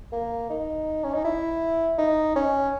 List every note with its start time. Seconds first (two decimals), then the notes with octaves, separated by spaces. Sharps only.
0.12 A#3
0.50 D#4
1.04 C#4
1.13 D#4
1.24 E4
1.98 D#4
2.36 C#4